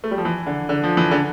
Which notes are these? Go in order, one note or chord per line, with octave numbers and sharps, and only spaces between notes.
A3
G3
F3
E3
D3
D3
F3
E3
D3